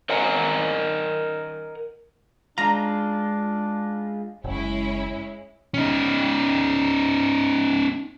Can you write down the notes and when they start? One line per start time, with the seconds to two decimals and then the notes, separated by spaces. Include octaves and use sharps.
0.09 A#4 D#5 F#5 G#5 A#5
2.58 G#3 D4 F4 A#5
4.44 F#1 G#3 C#4 E4
5.74 C#4 D#4